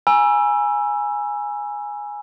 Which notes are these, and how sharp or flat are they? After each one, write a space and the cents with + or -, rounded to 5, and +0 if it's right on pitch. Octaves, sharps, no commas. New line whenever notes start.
G#5 +0 B5 -45 E6 +15